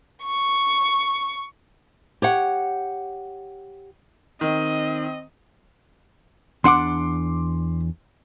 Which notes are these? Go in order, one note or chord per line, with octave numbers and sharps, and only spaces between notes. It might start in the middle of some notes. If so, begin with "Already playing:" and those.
C#6
G4 C#5 F#5
D#3 C4 D#5
E2 D4 F#5 C6 D6